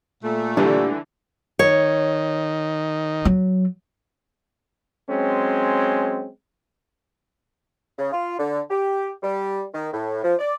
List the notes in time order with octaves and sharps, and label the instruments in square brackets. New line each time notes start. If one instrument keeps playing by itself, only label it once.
[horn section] A#2 A3
[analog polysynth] D3 E3 [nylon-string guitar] G3 [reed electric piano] D4
[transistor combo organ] D#3 [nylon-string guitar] C#5
[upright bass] F#3
[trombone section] F#3 G#3 C4 C#4
[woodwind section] C#3
F4
D3
G4
G3
D#3
A2
F3
D5